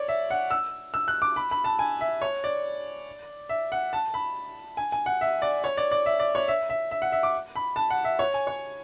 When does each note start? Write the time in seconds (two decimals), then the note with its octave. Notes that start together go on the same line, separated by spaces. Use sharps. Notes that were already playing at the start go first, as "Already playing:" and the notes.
Already playing: C#5 D5
0.08 E5
0.30 F#5
0.51 E6
0.94 E6
1.08 F#6
1.22 D6
1.36 B5
1.51 B5
1.64 A5
1.79 G#5
2.01 E5
2.22 C#5
2.44 D5
3.49 E5
3.72 F#5
3.93 A5
4.14 B5
4.77 G#5
4.92 G#5
5.06 F#5
5.21 E5
5.42 D5
5.64 C#5
5.77 D5
5.91 D5
6.06 E5
6.20 D5
6.35 C#5
6.48 E5
6.70 E5
6.91 E5
7.02 F#5
7.12 E5
7.23 D6
7.56 B5
7.76 A5
7.90 F#5
8.04 E5
8.19 C#5
8.34 G#5
8.47 C#5